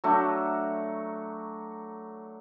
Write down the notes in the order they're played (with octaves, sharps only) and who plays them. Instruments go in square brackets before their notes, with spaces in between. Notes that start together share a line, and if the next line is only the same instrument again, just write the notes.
[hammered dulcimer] F#3 A3 D4